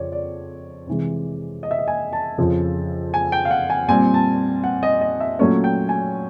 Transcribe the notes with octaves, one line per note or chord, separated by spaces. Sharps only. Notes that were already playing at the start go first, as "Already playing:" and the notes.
Already playing: F2 C#3 C#5 D5
D5
C3 E3 G#3
D#5
E5
D#5
G#5
A5
F2 C#3 F3
G#5
G5
F5
F#5
G#5
A#2 G3 C4 G#5
A5
F#5
D#5
D#5
E5
A#2 F#3 A3 C#4 C#5
G5
G#5